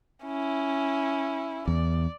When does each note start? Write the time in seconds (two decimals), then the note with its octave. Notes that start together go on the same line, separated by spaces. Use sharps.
0.24 C#4 E4
1.68 E2 D5